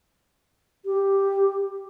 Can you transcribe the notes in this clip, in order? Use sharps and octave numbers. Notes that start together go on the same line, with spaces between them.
G4